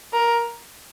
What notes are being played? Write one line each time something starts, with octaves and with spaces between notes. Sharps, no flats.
A#4